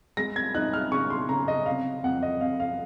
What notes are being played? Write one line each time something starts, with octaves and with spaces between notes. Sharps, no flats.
G#3 A#6
G#6
D#4 F#6
F6
C#3 C#6
C6
C#3 A#5
D#5
C3 F5
F2 F#5
D#5
F2 F5
F5